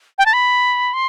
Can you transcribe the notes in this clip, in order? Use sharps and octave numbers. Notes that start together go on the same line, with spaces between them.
G5
A5
B5
C6